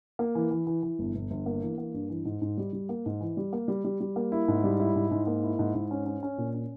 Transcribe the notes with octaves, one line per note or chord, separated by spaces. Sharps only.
A#3
E3
E3
E3
E3
G1
G1
G1
A#3
E3
A#3
G2
E3
G#2
G#2
G3
G3
A#3
G#2
E3
G3
A#3
G3
G3
G3
A#3
E4
G#2
G3
E4
G#2
G#2
A#3
E4
G#2
G#2
C#4
C#4
C#4
A#2
C#4